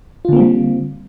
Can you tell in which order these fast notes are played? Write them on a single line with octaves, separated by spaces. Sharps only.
F4 D3 A#3 C4 G3